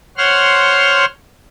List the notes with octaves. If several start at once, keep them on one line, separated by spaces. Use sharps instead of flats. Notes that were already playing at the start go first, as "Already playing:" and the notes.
C5 C#5 F#5 C6 F6